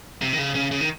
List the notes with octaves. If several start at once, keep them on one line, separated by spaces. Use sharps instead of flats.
C3
D#3
C#3
C#3
C#3
D#3